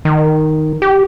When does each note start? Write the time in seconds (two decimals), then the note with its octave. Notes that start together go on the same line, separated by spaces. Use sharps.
0.05 D#3
0.82 G4